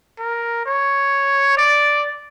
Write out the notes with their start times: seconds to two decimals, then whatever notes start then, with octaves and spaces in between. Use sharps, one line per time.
0.19 A#4
0.66 C#5
1.57 D5